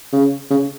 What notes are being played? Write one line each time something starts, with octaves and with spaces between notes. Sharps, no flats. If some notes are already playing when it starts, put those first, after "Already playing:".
C#3
C#3